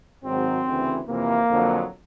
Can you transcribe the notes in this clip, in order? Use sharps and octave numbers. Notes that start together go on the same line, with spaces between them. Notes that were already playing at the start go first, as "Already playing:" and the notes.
G#1 G#2 D#3 F#3 C4
D2 C#3 E3
F2 C3 E3 A#3
F2 D3 F#3